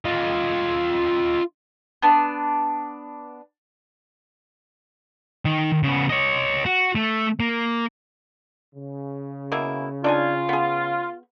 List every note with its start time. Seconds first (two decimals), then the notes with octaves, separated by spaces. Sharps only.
0.05 F4 D#5
2.02 B3 D4
5.45 D#3
5.83 C#3 B3
6.10 C#5 D#5
6.65 F#4
6.95 A3
7.40 A#3
8.75 C#3
9.52 B2 A#3 E4
10.04 D4 D#4 F4 G#5
10.49 B3 G#4